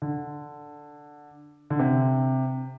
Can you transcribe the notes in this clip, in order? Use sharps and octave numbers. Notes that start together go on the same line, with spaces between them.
D3
D3
C3